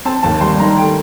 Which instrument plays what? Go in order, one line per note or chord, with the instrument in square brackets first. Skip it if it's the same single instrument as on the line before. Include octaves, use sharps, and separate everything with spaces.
[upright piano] C4 A5
D#2 A5
G3 C6
D#3 A#5
A3 G5